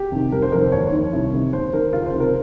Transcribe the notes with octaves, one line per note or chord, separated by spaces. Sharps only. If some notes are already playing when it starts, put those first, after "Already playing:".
Already playing: G4
C3 D#3
F1 A#4
C5
F2 C3 D#3 A#4
C5
D#2 C#5
C#5
D#3
C2
C3 D#3
D#2 C5
D#3 A#4
C#2 F4
C5
C3 D#3
A#4